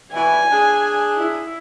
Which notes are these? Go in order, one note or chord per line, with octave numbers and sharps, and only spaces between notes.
B2 E3 G#5
D4 G#4
E4